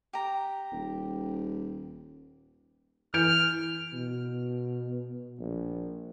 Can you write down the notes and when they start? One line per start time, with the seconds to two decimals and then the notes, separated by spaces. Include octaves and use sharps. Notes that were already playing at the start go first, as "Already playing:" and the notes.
0.13 G4 A#5
0.72 D#1
3.14 E3 F6 G6 D7
3.93 B2
5.39 A#1